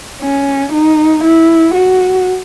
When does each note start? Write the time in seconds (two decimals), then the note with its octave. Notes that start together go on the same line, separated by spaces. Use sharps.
0.22 C#4
0.72 D#4
1.24 E4
1.74 F#4